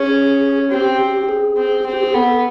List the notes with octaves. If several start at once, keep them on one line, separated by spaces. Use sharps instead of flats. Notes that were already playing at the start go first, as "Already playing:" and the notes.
Already playing: C#4 G#4
C4 G4
G#4
C4
C4
G4
G#4
B3 A4